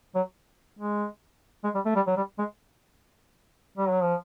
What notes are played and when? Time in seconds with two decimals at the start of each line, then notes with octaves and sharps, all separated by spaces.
0.15 F#3
0.79 G#3
1.64 G#3
1.75 G3
1.86 A3
1.96 G3
2.07 F#3
2.17 G3
2.39 G#3
3.77 G3
3.90 F#3
4.02 F3